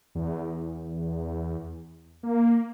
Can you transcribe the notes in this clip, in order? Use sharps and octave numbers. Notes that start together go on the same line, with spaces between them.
E2
A#3